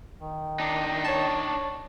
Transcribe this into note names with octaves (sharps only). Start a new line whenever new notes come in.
D#3
D4 D#4
C#5 A5